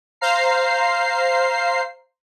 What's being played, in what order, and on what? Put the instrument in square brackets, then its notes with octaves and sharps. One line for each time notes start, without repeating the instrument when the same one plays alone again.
[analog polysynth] C5 F5 A#5 C7